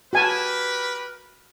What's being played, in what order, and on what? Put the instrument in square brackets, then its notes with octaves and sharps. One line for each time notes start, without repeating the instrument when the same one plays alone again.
[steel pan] F#4 G#5 A5 [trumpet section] G4 A#4 B4